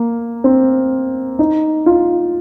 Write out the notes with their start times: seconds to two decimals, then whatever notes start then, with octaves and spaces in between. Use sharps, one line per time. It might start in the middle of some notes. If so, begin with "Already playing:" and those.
Already playing: A#3
0.44 C4
1.39 D#4
1.86 F4